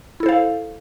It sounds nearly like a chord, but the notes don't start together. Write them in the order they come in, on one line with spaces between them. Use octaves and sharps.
E4 A4 C5 F5